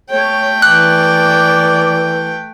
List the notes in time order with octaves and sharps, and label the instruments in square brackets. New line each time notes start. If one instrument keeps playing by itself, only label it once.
[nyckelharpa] A3 G5 [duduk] C#5
[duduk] E3 [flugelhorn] D5 [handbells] F#6